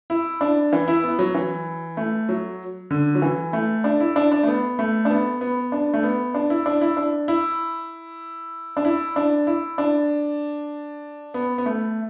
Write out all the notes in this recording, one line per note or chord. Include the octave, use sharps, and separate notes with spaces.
E4
D4
E3
E4
B3
F#3
E3
A3
F#3
D3
F#3
E3
A3
D4
E4
D4
D4
A3
B3
A3
D4
B3
B3
D4
A3
B3
D4
E4
D4
E4
D4
E4
D4
E4
D4
E4
D4
B3
B3
A3